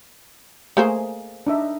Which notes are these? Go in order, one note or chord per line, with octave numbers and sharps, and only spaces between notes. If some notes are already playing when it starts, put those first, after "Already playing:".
A3 A#3 G#4 C5
D4 D#4 E5